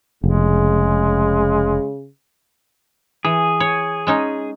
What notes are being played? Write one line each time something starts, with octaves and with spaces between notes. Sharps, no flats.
F1 C#3 G#3
E3 G#4
C#5
G#3 C#4 D#4